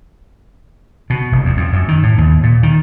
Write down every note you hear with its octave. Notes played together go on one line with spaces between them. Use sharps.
B2
F1
E2
F2
F#2
D#3
A2
D#2
A#2
D#3